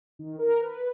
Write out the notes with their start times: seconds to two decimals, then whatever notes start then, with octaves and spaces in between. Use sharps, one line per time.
0.19 D#3
0.39 A#4
0.60 B4